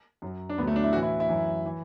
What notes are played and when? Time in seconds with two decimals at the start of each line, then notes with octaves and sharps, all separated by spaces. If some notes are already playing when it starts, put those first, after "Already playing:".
0.22 F#2 F#3
0.49 D4
0.58 D2 D3 F#3 B3
0.67 A3
0.76 D4
0.84 E4
0.93 A2 E3 F#4
1.02 E4
1.20 E4
1.29 F#2 E3
1.66 E3